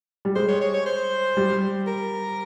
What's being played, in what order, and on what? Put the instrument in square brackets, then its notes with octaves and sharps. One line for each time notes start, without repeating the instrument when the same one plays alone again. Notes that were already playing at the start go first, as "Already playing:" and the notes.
[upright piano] G3
[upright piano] G#3 [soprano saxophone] C5
[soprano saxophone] C#5
C#5
C#5
C5
[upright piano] G3
[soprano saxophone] A#4